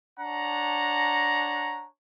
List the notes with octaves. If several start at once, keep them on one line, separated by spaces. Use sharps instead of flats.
D4 C#5 F#5 A5 A#5